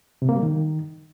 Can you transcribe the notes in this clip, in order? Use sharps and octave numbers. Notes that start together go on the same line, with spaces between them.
C3
A#3
G3
D#3